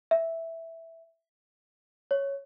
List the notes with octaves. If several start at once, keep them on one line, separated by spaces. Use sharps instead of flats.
E5
C#5